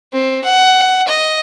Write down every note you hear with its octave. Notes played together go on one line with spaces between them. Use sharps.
C4
F#5
D#5